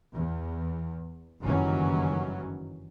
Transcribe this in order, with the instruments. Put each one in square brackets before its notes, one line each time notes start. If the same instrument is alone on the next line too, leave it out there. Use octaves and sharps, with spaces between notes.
[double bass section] E2
F#1 G2 D#3 E3 F#3 C#4